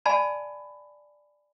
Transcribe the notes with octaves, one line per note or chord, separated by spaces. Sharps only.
D5 F5 G#5 A5 B5